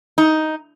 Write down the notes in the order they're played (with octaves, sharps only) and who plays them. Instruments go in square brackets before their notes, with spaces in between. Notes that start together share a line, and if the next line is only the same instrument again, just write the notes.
[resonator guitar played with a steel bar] D#4